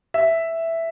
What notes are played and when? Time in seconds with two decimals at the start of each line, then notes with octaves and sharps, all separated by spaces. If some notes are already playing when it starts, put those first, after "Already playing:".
0.14 E5